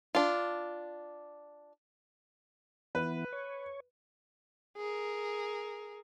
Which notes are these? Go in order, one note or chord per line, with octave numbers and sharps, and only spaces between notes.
D4 F4
E3 B3 B4
C#5
G#4 A#4